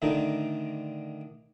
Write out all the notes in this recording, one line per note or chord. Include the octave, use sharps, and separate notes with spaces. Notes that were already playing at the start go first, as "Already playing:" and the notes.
A2 D3 D#3 D4 D#4